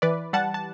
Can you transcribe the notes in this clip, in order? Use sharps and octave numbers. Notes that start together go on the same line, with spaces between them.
E3 B4 D5
G3 F#5 A5
A5